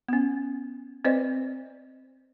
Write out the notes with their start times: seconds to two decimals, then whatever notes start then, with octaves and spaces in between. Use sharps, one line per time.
0.09 B3 C#4
1.05 C4 B4 C5 D5 D#5